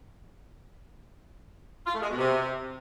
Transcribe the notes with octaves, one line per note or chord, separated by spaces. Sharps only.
F4
A3
G#3
B2
C3